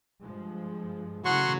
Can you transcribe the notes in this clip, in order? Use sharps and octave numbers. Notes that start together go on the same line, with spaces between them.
G2 F3 G#3
C#3 E3 F#3 A3 F#5 C6 C#6